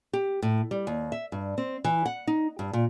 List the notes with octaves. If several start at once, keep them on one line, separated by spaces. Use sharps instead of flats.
G4
A2
G3
D#2
E5
G2
C4
E3
F#5
D#4
G2
A#2